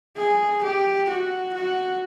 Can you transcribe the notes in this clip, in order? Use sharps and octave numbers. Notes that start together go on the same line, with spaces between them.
G#4
G4
F#4
F#4